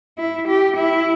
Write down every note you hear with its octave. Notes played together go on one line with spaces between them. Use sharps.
E4
G4
E4